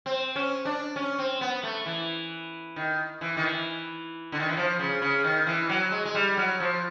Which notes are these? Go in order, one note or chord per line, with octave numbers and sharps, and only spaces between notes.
C4
C#4
D4
C#4
C4
B3
A3
E3
D#3
E3
D#3
E3
D3
D#3
E3
F3
C#3
C#3
D#3
E3
F#3
G#3
G#3
G3
F#3
F3